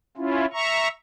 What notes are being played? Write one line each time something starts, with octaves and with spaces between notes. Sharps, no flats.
C#4 E4 F4
E5 A#5 C#6